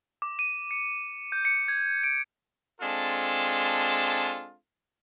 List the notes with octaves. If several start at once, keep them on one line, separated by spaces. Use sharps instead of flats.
D6
D#7
C#7
G6
C#7
G#6
D7
G#3 C4 D4 F4 A4